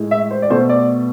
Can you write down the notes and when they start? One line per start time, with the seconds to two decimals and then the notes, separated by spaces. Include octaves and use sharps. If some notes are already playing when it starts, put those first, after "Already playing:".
Already playing: A2 G#3
0.11 E5
0.31 C5
0.42 D5
0.50 B2 A3 C5
0.69 D5